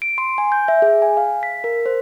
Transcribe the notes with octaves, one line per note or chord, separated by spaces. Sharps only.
D7
C6
G#5
G6
E5
G#4
G#5
F5
B6
A#4
C5